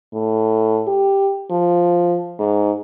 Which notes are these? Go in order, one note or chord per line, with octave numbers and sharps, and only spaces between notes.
A2
G4
F3
G#2